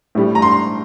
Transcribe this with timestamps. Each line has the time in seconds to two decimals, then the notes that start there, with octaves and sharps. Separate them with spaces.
0.15 A2 G3
0.35 A#5
0.42 C6